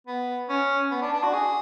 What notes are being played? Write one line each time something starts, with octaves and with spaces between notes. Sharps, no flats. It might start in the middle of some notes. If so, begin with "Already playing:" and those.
B3
C#4
B3
D4
D4
F#4
G#4